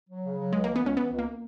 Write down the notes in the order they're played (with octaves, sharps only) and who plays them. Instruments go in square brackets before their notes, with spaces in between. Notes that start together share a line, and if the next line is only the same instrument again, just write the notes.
[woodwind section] F#3
C#3
F#3
[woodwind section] C#2 [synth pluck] G#3
[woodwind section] E3 [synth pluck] A#3
[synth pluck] B3
[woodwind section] C#2 [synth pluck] C#4
[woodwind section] E3 [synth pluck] B3
[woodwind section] C#2
[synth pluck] A#3